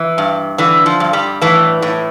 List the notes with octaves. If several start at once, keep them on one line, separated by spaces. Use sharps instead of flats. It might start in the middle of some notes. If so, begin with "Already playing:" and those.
Already playing: E3
G2
D3 E3
F3
G2
G3
A2 E3
A2